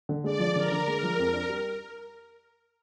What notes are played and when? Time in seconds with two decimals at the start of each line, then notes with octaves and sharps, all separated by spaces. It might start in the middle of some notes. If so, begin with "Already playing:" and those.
0.09 D3
0.24 G#3 D5
0.39 F3
0.56 D3 A#4
0.72 D3
0.87 G#3
1.03 F3
1.19 F2
1.33 D4
1.49 G3